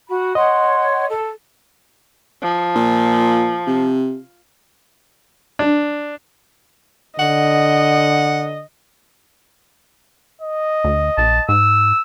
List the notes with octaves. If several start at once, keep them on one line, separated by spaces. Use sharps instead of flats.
F#4 B5
C#5 D#5 F#5 C6
A4
F3
A#2
C3
D4
D3 D#5 F#5
D#5
D2
A#1 A5
G#2 E6